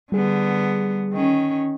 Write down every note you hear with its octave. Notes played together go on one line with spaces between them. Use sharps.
D3 G3 B3 G#4
D#3 C#4